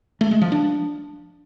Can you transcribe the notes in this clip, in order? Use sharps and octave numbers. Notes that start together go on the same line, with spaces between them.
A3
G#3
F3
D4